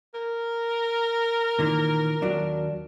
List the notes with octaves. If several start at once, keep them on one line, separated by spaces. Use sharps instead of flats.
A#4
A#2 D#3 E3
D#2 F#3 D4